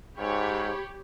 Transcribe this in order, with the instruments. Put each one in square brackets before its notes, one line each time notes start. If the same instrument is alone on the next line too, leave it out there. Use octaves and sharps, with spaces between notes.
[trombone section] G#2 [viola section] G4 C#5 B5